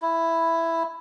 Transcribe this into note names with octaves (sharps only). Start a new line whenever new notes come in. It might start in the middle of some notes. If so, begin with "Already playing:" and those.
E4